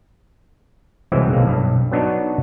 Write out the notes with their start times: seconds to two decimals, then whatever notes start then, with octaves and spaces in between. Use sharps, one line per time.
1.12 C2 E3 F#3 G#3 C4
1.33 B1 A#3
1.48 B1 G2
1.92 F#3 B3 D4 D#4 F#4 C#5